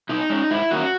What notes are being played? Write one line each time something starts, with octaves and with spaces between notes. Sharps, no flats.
B2 D#4
G#3 C#4
G#2 E4
D#3 A#3 C#4 F#4